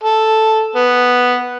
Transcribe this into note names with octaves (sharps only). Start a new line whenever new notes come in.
A4
B3